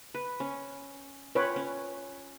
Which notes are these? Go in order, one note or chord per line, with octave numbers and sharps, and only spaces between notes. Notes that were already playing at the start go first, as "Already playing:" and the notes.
B4
C#4
C#4 F4 B4 C#5 G5
C#4